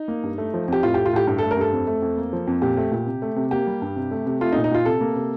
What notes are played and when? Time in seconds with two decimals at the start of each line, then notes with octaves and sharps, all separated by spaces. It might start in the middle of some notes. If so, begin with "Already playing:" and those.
Already playing: D#4
0.08 A#3
0.23 G2
0.38 A3
0.54 F3
0.68 F2 G4
0.83 A2 F4
0.94 A3 G4
1.06 F4
1.13 A2 G4
1.27 G2 G4
1.38 A3 A4
1.51 A#4
1.57 G2 A4
1.72 F2
1.87 A3
2.02 F2
2.17 A#3
2.33 F3
2.47 F2
2.62 A#2 G4
2.77 A3
2.92 A#2
3.06 C3
3.22 A3
3.36 C3
3.51 A#3 G4
3.67 G3
3.82 G2
3.96 C3
4.11 A3
4.26 C3
4.41 A3 F4
4.52 D#4
4.56 A#2
4.64 D#4
4.71 A#2 F4
4.85 C3 A4
5.01 A#3
5.16 C3